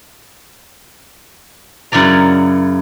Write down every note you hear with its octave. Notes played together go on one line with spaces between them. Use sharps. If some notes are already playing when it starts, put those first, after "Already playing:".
F#2 C#3 E4 D5 A#5